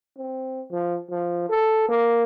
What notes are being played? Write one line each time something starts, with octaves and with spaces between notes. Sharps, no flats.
C4
F3
F3
A4
A#3